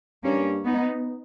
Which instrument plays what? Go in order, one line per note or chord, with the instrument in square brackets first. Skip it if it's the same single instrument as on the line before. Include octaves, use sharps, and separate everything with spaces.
[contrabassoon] G2 [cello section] A#3 C#4
[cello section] B3 D#4